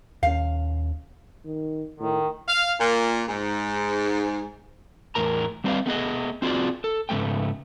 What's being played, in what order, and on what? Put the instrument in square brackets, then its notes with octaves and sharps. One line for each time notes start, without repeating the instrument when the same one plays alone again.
[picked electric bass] D#2 C#4 [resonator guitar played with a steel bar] F5
[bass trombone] D#3
[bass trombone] A2 [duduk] D#3
[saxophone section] F5
A#2
G#2
[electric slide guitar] E2 A2 A#4 A#5
G3 C4 D4 B4 D5 F5
A3 B3 G#4 D#5
C4 F4 F#4 G#4 D5
A4
G#2 C#3 G#3 A3 B3 G5